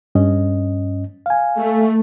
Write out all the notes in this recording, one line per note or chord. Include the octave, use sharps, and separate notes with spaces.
G2 C#4 D#5
F5 G#5
A3